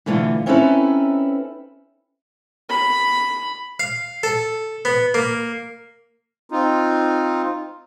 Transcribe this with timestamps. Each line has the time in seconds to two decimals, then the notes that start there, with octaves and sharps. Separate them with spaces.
0.06 B2 D3 E3 A3 F4
0.46 C4 C#4 D#4 E4 A4 B4
2.69 B5
3.80 F5
4.23 A4
4.85 B3
5.14 A#3
6.50 C4 D#4 F4